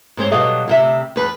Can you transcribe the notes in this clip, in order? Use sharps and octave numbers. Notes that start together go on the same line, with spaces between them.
G#2 C4 C5 C#5
B2 F#3 G3 A4 D#5 F5
D2 C3 E5
E2 B4